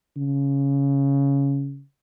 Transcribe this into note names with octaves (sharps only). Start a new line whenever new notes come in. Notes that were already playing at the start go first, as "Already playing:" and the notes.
C#3